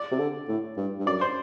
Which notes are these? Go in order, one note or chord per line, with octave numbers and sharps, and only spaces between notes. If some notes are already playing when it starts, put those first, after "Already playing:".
Already playing: D5
C3
D3
A2
G2
G2
F#2 D5
C5